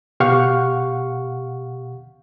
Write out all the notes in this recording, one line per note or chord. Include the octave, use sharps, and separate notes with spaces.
B2 G4 F5 F#5 C#6